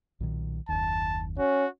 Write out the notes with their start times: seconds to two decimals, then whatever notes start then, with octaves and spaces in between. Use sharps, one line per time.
0.20 B1 A#2 D#3
0.69 F#1 D#2 A5
1.38 C#4 F#4